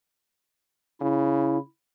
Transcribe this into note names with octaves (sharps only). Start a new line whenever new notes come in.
C#3 E4